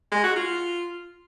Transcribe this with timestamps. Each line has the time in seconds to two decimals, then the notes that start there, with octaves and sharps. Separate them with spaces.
0.12 G#3
0.24 F#4
0.36 F4